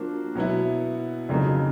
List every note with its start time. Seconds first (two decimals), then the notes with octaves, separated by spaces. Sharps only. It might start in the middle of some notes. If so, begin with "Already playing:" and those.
Already playing: F3 A#3 D4 F#4
0.35 B2 F#3 B3 E4
1.29 F2 C#3 F#3 A#3 D#4